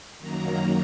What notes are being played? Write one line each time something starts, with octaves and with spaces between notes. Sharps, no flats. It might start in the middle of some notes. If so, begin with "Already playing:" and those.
F#2 D#3 F#3 A#3 A#5